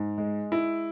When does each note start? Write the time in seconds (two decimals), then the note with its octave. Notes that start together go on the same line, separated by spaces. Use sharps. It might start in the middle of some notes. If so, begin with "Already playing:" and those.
Already playing: G#2
0.18 G#3
0.52 E4